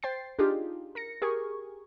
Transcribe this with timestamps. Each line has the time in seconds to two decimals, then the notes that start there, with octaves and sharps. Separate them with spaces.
0.03 C5 G5 A6 C7
0.39 D4 D#4 F4 G4 G#4
0.95 A#4 A#6 C#7
1.22 G4 G#4 A#4 G#5 C#6